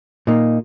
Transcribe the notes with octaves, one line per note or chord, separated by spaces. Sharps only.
A#2 A#3 D#4